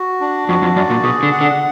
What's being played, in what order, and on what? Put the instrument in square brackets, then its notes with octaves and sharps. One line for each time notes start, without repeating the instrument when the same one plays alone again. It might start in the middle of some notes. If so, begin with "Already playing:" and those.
Already playing: [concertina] F#4
D4
[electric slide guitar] F2 [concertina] F#4
[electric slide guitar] F2
[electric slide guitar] F#2 [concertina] D5
[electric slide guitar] A#2
[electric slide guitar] B2 [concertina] G#4
[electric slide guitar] D3
[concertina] F#5
[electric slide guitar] D3